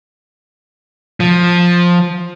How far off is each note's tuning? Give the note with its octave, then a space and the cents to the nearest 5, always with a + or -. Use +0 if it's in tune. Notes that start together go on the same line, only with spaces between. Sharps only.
F3 +10